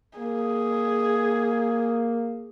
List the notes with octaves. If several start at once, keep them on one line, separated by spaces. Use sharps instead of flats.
A#3 G#4